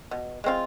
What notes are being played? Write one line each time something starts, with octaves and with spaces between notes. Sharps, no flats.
B2
G#3 C4 F4